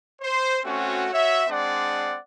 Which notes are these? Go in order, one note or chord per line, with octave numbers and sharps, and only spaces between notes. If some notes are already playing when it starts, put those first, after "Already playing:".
C5
A3 C4 C#4 F#4
F#4 C#5 E5
G#3 C4 D4 D5 F#5